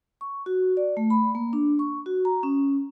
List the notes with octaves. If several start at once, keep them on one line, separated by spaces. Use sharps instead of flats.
C#6
F#4
D5
A3
B5
A#3
D4
C#6
F#4
A#5
C#4